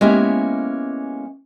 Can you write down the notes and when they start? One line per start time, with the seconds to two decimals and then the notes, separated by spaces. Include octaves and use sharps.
0.01 G#3 A#3 B3 C#4 E4 G4